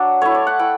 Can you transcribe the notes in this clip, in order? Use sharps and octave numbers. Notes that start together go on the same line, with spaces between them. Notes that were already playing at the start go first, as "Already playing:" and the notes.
Already playing: F#3 D4
A3 E4 C#5
D5
F#5
E4 G5